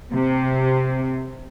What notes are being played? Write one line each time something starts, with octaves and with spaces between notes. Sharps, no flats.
C3